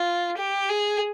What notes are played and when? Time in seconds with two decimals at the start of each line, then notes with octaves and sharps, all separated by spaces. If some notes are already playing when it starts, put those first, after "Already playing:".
Already playing: F4
0.37 G4
0.69 G#4